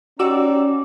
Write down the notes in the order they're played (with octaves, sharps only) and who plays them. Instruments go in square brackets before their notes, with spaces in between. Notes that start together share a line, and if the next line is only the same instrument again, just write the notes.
[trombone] C#4 [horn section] D#4 G4 D5 [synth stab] F#4 E6